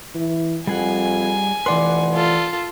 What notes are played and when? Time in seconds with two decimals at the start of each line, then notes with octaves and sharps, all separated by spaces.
0.15 E3
0.67 F2 G3 G#4 F#5 G#5
1.66 F1 E3 B4 D5 F#5 C6 D6
2.14 F4 A4